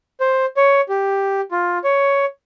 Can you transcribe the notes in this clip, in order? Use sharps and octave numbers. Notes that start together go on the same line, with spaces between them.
C5
C#5
G4
F4
C#5